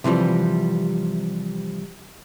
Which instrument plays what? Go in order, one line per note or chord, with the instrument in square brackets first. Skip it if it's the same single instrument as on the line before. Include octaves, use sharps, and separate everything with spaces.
[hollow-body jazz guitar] C3 E3 F3 G3